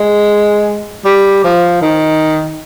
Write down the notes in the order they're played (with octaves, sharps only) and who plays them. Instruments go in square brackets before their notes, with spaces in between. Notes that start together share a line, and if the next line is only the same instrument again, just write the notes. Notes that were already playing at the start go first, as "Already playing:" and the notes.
Already playing: [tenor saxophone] G#3
G3
F3
D#3